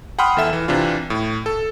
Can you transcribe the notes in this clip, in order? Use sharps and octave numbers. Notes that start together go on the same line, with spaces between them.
F#5 G5 B5 C6 D#6 F6
E2 A4 E5 E7
E3
C3 E3 D4 F4
A2
A4